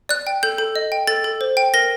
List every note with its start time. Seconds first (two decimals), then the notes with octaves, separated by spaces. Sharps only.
0.09 D5 F#6
0.27 G5
0.43 A4 G6
0.58 A4
0.76 D#5
0.92 G5
1.07 A4 A6
1.24 A4
1.41 C5
1.57 G5
1.74 A#4 A#6